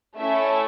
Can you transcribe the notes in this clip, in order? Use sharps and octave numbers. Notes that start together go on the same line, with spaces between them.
A3 C#4 E4 A4 E5